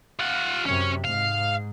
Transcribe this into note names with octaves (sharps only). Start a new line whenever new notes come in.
F4 F#5
F#2 C3 C#4 C#5
G#2 F5